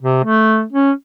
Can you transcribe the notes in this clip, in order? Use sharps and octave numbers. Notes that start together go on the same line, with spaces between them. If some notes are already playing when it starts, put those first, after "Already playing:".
C3
A3
C#4